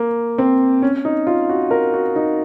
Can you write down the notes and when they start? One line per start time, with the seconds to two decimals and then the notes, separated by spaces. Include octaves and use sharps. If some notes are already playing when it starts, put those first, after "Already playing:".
Already playing: A#3
0.38 C4
0.82 C#4
1.05 D#4
1.27 F4
1.49 F#4
1.71 A#4
1.94 F#4
2.16 D#4